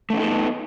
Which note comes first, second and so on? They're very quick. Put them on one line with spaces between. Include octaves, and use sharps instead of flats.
A3 C#4 D#4 A4 B3